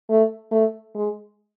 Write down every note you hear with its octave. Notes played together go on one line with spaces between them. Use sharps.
A3
A3
G#3